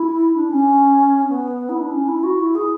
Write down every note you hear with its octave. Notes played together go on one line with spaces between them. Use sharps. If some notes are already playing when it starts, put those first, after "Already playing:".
Already playing: E4
D4
C#4
B3
E4
D4
C#4
E4
F#4
E4
G#4